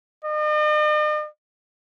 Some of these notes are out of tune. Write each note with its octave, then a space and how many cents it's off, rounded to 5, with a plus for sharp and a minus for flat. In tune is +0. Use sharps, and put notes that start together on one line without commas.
D#5 -45